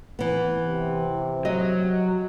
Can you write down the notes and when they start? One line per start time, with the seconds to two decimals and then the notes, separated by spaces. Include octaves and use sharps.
0.19 E3 B3
0.63 C3
1.45 F#3 D#5